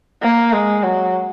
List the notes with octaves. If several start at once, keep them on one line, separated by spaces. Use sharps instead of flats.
A#3
G#3
F#3